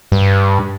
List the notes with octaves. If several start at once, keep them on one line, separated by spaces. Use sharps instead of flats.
G2